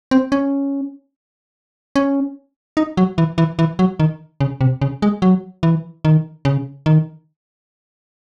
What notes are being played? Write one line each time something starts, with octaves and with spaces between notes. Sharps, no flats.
C4
C#4
C#4
D#4
F#3
E3
E3
E3
F#3
D#3
C#3
C3
C#3
G#3
F#3
E3
D#3
C#3
D#3